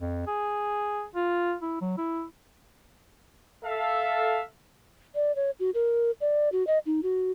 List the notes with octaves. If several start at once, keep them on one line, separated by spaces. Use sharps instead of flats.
F2
G#4
F4
E4
F#3
E4
A4 E5 F5
D5
C#5
F#4
A#4
D5
F#4
D#5
D#4
F#4